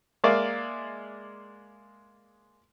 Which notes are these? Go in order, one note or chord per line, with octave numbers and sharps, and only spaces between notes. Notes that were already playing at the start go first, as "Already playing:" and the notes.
G#3 A#3 D5 E5 F5